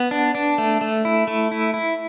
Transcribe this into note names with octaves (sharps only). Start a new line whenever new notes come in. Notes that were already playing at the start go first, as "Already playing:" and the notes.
Already playing: B3
D4
D4
A3
A3
E4
A3
E4
E4